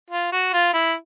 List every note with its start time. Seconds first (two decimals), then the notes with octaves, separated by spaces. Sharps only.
0.11 F4
0.33 F#4
0.53 F4
0.74 E4